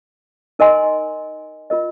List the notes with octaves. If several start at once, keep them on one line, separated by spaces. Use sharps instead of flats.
D#4 A#4 D#5 G#5 C6
F4 A#4 D#5